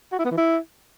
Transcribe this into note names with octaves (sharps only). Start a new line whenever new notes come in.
F#4
E4
B3
E3
E4